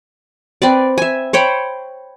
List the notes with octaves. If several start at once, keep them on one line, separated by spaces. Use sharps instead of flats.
C4 B4 D5
E5 G#5
C5 C#5 G5 B5